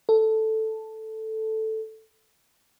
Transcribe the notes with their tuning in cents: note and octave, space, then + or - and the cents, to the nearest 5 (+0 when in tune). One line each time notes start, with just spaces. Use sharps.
A4 +0